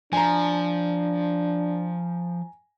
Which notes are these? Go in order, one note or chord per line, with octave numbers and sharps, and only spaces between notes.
F3 D4 G#5 A#5